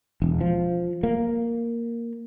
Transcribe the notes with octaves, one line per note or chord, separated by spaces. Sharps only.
E1
F3
A#3